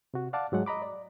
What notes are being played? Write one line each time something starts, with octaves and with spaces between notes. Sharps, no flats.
C3 F#4
D5 F5 F#5 A5 D6
G#2 F#3 G#3 F#5
D#5 A#5 B5 D6
D5